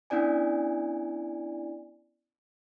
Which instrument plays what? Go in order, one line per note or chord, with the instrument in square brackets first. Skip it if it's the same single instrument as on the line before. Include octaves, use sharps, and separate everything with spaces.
[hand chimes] B3 C#4 D4 E4 D5 G#5